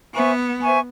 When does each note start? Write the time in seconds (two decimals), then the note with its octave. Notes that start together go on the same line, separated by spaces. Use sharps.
0.14 B3 C5 E5 G#5 C#6
0.62 C5 E5 G#5 C#6